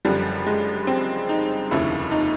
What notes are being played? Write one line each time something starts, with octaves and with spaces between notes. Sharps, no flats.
F#1 F#2 D3 F3 G3
G#3
C4
D#4
F1 D#2 C#3 F3 E4
D#4